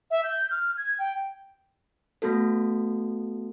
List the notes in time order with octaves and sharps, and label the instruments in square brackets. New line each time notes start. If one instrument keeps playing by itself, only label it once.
[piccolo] E5
G6
F6
G#6
G5
[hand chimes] A3 B3 F#4 A4